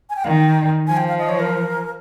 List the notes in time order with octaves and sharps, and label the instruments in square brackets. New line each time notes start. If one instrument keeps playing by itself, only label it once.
[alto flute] G#5
G5
[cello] D#3 [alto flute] F5
[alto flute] G5
[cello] F3 [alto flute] G#5
[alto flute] G5
F5
D#5
C#5
A#4